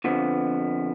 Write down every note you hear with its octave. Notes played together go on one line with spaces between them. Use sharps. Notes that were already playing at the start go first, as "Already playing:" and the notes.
F2 D3 F3 B3